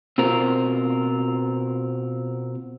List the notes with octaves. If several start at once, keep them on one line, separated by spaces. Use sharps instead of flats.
B2 C4 F4 A#4